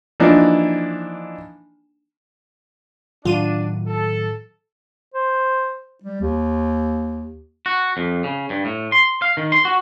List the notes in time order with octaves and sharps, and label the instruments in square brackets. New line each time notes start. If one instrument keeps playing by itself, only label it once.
[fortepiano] E3 F3 A#3 D4 D#4
[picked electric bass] A2 D#3 F#3 [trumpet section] D4 [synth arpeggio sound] F4 D#7
[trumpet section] A4
[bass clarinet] C5
G3
D#2
[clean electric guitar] F#4
F2
C#3
G2
A2
C6
F5
D#3
C6
F#4